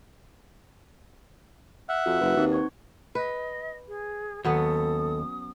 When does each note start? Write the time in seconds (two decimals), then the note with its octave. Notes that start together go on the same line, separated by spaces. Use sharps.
1.89 E5 F#5 F6
2.06 F2 F#4
2.21 F#1 B4
2.37 D#2 C4 D#4
2.52 C5 C#6 G#6
3.15 B4 D#5
3.88 G#4
4.45 D#2 F#3 B3 C#4 A4 D#6